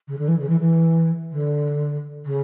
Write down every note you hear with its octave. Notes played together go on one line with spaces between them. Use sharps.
C#3
D3
E3
C#3
E3
E3
D3
C#3